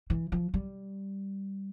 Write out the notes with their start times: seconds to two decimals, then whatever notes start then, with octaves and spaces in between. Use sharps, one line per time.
0.10 E3
0.32 F3
0.54 G3